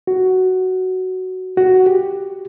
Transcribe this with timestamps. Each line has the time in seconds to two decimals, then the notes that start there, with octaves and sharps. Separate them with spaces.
0.07 F#4
1.57 F#4
1.86 G4